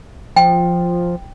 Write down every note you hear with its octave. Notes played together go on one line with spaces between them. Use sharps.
F3 G5